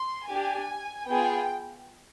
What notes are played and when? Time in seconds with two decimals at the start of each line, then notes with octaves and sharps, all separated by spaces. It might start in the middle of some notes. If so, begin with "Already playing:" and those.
Already playing: C6
0.27 D4 G4 G#5
1.06 B3 F4 G#4 G5